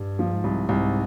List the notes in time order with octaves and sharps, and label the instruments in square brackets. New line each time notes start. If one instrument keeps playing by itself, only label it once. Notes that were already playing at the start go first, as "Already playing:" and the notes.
Already playing: [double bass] G2
[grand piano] F3
[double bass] G#2
[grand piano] C2
[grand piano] C2 [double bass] G#2